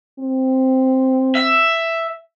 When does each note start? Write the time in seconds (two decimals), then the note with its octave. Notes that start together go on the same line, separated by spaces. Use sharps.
0.19 C4
1.35 E5